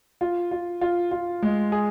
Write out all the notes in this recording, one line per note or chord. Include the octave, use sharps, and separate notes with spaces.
F4
F4
F4
F4
G#3
G#4